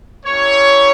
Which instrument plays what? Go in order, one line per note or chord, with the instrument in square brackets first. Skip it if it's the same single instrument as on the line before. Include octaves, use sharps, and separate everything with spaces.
[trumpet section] A#3 C#4 E4 G4 C#5